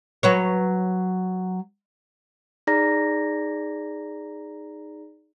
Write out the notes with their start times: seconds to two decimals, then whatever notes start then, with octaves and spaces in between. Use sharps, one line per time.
0.23 F#3 B4 C#5
2.67 D#4 G#4 D5 A#5 A#6